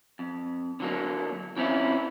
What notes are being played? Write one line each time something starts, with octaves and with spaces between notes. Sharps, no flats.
F2
D3 F#3 A#3
E3 C4 C#4 E4 F4